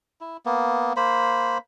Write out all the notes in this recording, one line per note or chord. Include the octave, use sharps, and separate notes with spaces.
E4
A#3 B3
A#3 C5 B5